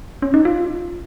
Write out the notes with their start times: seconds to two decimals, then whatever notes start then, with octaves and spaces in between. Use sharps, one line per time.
0.22 C#4
0.34 D#4
0.45 F4